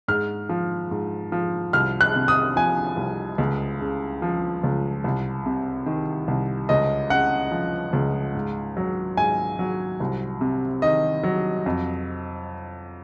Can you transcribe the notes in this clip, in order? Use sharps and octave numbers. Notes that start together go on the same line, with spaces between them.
G#2 F6
F3
G#2
F3
C2 F6
F#6
C3
D#6
F3 G#5
C2
C#2
C#3
F3
C#2
C2
C3
D#3
C2
C#2 D#5
C#3 F#5
F3
C#2
G#2
F#3
G#2 G#5
F#3
C2
C3
D#3 D#5
F#3
F2